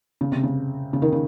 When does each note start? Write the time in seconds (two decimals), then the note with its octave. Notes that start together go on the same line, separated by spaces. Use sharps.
0.21 C#3
0.32 C3
0.43 C#3
0.93 C#3
1.02 D#3
1.12 C#3